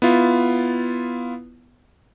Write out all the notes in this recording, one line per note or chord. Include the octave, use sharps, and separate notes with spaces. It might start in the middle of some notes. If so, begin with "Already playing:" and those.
B3 E4 F4